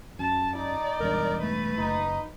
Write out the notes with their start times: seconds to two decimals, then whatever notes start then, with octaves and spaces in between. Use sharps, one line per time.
0.19 F#2 A5
0.57 D#4 D5
1.00 E1 G2 A#4
1.42 A3 B4
1.78 F#1 D#4